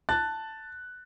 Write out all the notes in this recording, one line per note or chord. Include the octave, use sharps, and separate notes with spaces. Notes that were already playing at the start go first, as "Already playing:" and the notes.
A5 F#6 A6